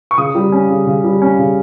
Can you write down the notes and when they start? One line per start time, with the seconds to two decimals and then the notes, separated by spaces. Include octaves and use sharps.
0.11 C#6
0.18 C#3 D#6
0.35 G3
0.52 C#4
0.70 C#3
0.87 C#3
1.04 G3
1.22 C#4
1.39 C#3